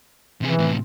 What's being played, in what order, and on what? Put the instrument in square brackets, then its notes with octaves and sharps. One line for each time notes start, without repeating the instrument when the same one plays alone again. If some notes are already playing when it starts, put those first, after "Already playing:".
[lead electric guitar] C3 G#4 [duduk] E3
[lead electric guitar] A2 C3